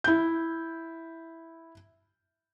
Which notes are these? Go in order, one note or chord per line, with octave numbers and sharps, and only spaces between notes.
E4 G6